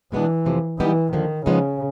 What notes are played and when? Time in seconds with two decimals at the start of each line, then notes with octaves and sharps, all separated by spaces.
0.12 B2 E3 G#3 B3 D4
0.45 F2 C3 F3 A3
0.79 E3 G3 B3 D#4 G4
1.12 D#2 D3 D#3 F3
1.46 C#3 F3 G#3 B3 D#4